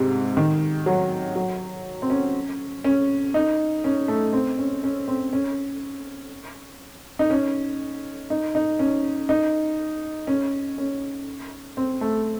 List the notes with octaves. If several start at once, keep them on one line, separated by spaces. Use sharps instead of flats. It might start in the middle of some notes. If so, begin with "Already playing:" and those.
Already playing: G#2 C3
D#3
F#3
F#3
C4
C#4
C#4
D#4
C#4
A3
C4
C#4
C#4
C4
C#4
D#4
C#4
D#4
D#4
C#4
D#4
C#4
C#4
C4
A3